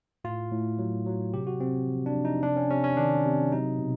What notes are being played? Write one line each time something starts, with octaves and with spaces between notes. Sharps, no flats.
A2 F4
A2
F#3
F#3
C3 G4
F#4
C3 C4
F3
D4
F3
D#4
C3 D4
C#4
C3 C#4
C#4
D#3 D4
C3
F#3 D#4
B2